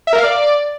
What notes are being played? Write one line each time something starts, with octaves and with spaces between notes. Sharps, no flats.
E5
A#4
F5
D5